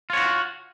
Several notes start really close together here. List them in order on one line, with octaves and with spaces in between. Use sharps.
F4 C#5 F#4